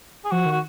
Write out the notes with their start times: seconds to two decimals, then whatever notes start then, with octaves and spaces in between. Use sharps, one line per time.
0.25 G#4
0.31 F3 F#4
0.46 D#3
0.51 F#4